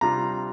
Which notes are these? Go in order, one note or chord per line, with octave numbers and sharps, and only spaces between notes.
C3 G3 D4 F4 A#5